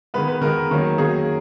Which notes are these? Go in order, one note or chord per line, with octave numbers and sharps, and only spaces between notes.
D#3 G#3 B3 B4
B4
D#3 G#3 B3 A#4
D#3 F#3 A#3 C#4
D#3 F#3 A#3 C#4 G#4